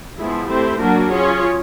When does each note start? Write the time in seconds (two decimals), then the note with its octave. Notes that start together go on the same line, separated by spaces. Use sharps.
0.18 F3 G#3 B3 E4 G#4
0.49 A3 C4 E4 G4 C5
0.80 F#3 A#3 D4 F#4 A#4
1.11 C#4 F4 G#4 C#5